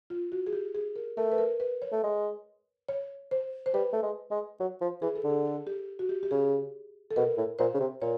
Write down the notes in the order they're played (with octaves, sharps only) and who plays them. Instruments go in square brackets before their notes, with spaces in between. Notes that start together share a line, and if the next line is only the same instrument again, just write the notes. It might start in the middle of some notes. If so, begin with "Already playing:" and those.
[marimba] F4
F#4
G#4
G4
G#4
A#4
[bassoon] A3 [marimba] A#4
[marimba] B4
A#4
B4
C#5
[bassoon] A3
G#3
[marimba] C#5
C5
C5
[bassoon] G3 [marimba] B4
[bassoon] A3
G#3
G#3
F#3
F3
[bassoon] E3 [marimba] G#4
[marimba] A4
[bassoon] D3
[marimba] G#4
A4
G4
F#4
G4
G4
[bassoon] C#3 [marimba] G#4
[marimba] A4
[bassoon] B2 [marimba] A#4
[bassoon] A2
[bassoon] A#2 [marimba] C5
[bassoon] C#3
C3
[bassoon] A#2 [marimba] C#5